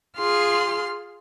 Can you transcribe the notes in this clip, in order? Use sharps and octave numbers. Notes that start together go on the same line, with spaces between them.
F4 G#4 C6 F6